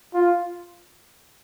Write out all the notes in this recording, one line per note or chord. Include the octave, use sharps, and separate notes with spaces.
F4